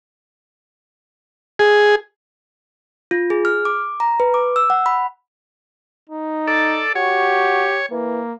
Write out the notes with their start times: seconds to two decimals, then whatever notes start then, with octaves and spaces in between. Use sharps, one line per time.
1.59 G#4
3.11 F4
3.30 G#4
3.45 F6
3.65 D6
4.00 A#5
4.20 B4
4.34 D6
4.56 E6
4.70 F#5
4.86 B5
6.10 D#4
6.47 A4 D5
6.95 F#4 G4 C#5
7.91 E3 A#3